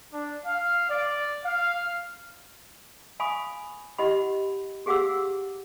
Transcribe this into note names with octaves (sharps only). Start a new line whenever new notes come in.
D4
F5
D5
F5
F5 G#5 B5 C#6 D#6
E4 G4 D#5 F#5 B5
G4 G#4 F5 F#5 D6 E6